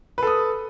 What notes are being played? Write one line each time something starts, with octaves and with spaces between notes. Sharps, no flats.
A4 B4 D#6